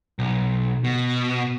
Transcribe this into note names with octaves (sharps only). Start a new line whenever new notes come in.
B1
B2